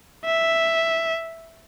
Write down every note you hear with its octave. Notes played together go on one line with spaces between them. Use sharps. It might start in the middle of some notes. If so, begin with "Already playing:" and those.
E5